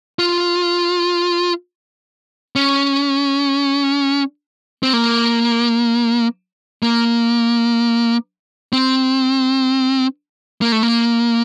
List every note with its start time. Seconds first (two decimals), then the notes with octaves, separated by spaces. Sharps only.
0.19 F4
2.56 C#4
4.83 C4
4.93 A#3
6.83 A#3
8.73 C4
10.61 A#3
10.72 A3
10.83 A#3